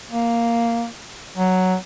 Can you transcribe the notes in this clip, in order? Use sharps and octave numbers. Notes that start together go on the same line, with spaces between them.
A#3
F#3